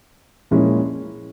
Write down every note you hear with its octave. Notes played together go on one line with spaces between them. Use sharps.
A#2 F3 G#3 C#4 E4